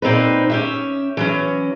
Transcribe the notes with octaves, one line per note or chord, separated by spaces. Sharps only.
A#2 C4 D#4 B4
C#4 G4 E5
E3 F#3 C#4